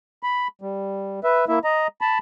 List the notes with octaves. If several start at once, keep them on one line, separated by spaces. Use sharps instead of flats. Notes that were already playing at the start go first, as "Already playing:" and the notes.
B5
G3
B4 E5
A#3 E4 E5
D#5 A#5
A5 B5